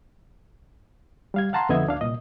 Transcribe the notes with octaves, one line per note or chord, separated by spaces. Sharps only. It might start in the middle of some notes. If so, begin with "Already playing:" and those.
G3 F5 G#6
F5 F#5 A5 A#5 C6
F2 D3 B3 D#5 E5 G#6
D2 D4 F5
C2 A#2 D#5